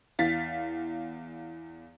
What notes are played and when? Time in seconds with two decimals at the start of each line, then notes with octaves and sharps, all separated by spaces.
0.19 E2 F5 A6 B6